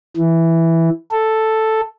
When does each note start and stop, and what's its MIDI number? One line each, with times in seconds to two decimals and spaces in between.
0.17 0.89 52
1.12 1.81 69